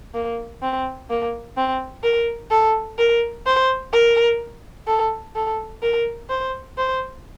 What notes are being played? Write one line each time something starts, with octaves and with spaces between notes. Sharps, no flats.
A#3
C4
A#3
C4
A#4
A4
A#4
C5
A#4
A4
A4
A#4
C5
C5